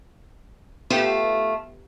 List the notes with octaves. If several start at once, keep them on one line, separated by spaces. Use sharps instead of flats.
A3 B3 F4 G4 E7